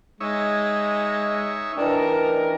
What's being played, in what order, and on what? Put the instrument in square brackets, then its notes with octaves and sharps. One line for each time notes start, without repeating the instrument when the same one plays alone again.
[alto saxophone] G#3 [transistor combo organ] D#4 C#5 E5
[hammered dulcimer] E3 D#4 G4 [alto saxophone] D4 [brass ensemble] A#4